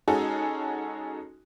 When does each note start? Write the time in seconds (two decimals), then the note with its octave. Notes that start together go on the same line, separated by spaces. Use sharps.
0.08 G#3 C#4 D#4 F#4 G#4 A4